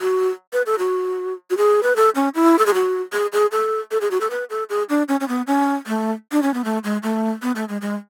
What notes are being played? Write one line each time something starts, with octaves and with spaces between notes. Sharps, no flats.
F#4
B4
A4
F#4
F#4
G#4
B4
A4
C#4
E4
A4
G#4
F#4
G#4
G#4
A4
A4
G#4
F#4
A4
B4
A4
G#4
D4
C#4
C#4
B3
C#4
A3
D4
C#4
B3
A3
G#3
A3
B3
A3
G#3
G#3